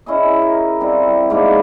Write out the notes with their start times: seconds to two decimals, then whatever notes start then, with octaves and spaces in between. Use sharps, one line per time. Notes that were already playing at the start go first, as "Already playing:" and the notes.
0.06 C#4 E4 G#4 D#5
0.42 A#4
0.80 G3 C4 E4 F4
1.30 G#2 A#3 B3 D4